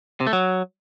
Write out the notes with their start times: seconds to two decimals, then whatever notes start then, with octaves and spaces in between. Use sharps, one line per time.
0.20 C3
0.27 A3
0.33 F#3